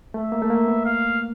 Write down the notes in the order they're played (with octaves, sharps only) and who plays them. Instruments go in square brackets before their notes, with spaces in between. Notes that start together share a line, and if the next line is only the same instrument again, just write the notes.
[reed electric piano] A3 [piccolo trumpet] E5
[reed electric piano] A#3
A3
A#3
B3
[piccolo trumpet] F5